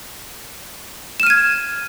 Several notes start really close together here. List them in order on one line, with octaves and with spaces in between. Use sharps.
E7 F6 D#7 G#6